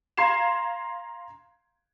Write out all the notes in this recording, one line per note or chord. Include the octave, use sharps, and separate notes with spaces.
F5 A#5 C6 G#6 C7 E7